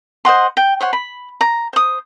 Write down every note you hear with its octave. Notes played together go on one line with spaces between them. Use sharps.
C5 D#5 F#5 C6
G5
C5 C#5 F#5
B5
A#5
C5 D#6